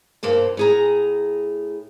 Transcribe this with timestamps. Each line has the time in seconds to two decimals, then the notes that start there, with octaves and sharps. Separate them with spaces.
0.23 G2 B2 A#3 C5
0.57 A2 G#4 A#5